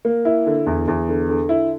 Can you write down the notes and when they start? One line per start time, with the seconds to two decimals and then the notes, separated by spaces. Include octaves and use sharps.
0.05 A#3
0.25 E4
0.47 D3
0.67 E2
0.88 E2
1.09 D3
1.29 D3
1.49 E4